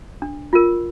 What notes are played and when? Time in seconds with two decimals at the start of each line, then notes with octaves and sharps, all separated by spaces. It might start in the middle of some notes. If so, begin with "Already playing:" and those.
0.22 D4
0.53 F4 A#4